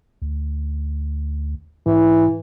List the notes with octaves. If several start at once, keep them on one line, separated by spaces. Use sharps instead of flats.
D2
G#2 E3